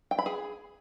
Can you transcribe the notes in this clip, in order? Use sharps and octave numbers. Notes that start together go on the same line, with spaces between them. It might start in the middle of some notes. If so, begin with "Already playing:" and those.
G5
B5
G#4